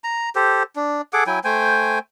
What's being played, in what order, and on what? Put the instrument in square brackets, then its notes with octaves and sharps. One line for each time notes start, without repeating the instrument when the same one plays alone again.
[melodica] A#5
G4 A4 C5
D4
G#4 A4 F#5 D6
F#3 E4 G5 G#5
A3 C5 G5 G#5